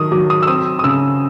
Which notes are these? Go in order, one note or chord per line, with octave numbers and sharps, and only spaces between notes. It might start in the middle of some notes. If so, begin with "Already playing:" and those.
Already playing: D#3 F#3 D#6
F#3 D6
D#6
E6
C4 D#6
D#6
C#3 E6